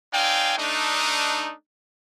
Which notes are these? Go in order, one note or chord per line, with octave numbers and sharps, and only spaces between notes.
C4 D#4 D5 F5 G5 G#5
A3 D4 D#4